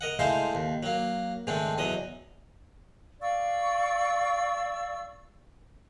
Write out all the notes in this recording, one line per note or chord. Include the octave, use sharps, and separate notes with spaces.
A#4 D#5 F#5
G#3 A3 D#4 E4 C5 F5
D#2
F#3 A#3
G#2 D#3 A3 C4 D4
E2 F#3 D#5
D5 F5 C#6 E6